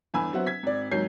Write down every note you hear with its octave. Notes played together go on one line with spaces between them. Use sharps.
G1 E2 G#5 B5 E6
F#3 B3 C4 C5 E5 F#5
G#6 B6
G#1 D5
D#2 G#2 F#3 C#5 G6 C7